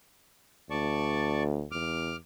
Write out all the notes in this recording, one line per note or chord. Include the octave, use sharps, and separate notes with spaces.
D2 D5 A5 C#6
E2 D6 F6